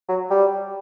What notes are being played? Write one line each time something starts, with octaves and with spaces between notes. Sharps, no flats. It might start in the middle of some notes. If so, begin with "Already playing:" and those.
F#3
G3